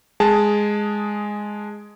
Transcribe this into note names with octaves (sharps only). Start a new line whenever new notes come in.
G#3 G#4 A5